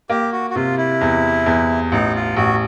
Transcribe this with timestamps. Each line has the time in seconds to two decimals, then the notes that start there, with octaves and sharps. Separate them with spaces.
0.09 A#3 G4
0.32 F#4
0.50 F#4
0.55 C3 F4
0.77 E4
1.01 E2
1.46 E2
1.92 A1 D#4
2.15 F4
2.37 A1 F#4